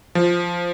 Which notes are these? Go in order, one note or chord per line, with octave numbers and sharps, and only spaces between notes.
F3